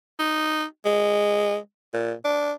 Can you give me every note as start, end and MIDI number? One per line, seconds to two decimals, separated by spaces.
0.19 0.64 63
0.85 1.57 56
1.94 2.13 46
2.25 2.52 62